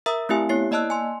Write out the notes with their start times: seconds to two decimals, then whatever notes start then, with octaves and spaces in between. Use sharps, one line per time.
0.06 A#4 E5 A#5 D#6 E6
0.29 A3 C4 E4 G4 E5 G#5
0.49 B3 E4 C#5 C7
0.71 A#3 D5 D#5 A5 E6 F#6
0.90 G#5 C6